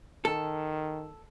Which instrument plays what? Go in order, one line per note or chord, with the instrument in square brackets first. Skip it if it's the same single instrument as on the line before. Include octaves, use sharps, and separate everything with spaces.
[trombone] D#3 [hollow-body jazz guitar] A4